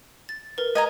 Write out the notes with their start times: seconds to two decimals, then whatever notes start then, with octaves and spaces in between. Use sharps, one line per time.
0.29 A6
0.58 A#4 B4
0.75 D#5 G#5 A#5